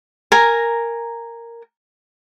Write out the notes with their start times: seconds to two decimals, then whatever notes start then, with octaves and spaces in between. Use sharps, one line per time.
0.32 A#4 G#5 A#5